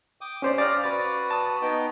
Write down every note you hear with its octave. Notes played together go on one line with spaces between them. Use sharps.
G5 D6 D#6
C#4 G4 C5 D5
D5 F5 A#5 D#6 F6
F#4 B4 A6
A5 D#6
B3 D#4 G5